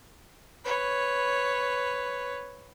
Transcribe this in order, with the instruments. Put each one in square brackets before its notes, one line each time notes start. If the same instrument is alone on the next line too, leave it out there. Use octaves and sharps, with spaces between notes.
[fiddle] B4 C#5